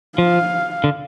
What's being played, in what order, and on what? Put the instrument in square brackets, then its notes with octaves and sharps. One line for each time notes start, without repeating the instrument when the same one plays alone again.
[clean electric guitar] F3 [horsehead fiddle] F5
[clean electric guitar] D3